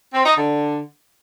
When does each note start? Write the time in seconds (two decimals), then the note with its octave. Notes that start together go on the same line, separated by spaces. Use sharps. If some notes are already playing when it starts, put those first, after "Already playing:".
0.13 C4
0.25 D#4
0.37 D3